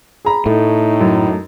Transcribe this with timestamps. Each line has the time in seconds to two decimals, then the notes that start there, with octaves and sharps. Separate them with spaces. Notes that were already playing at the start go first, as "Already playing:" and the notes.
0.25 G#4 A#5 B5
0.46 A2 A3 D#4
1.01 F#2